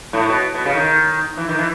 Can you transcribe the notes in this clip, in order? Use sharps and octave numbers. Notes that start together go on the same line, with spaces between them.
A2
B2
B2
C#3
D#3
E3
D#3
E3